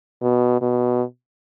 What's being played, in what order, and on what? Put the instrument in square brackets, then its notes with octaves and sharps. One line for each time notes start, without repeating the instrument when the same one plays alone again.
[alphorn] B2
B2